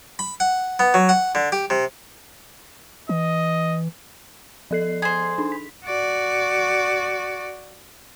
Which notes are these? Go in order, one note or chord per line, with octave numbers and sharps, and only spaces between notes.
B5
F#5
B3
F#3
F#5
D3
G4
C3
E3 D#5
F3 A4 C7
G#4 C5
D4 D#4
B6
F#4 D5